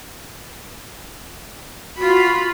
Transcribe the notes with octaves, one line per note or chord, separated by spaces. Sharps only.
F4 F#4 B5